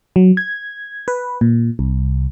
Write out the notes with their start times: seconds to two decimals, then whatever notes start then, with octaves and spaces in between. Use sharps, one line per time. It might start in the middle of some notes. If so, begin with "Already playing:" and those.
0.16 F#3
0.37 G#6
1.08 B4
1.41 A#2
1.79 C2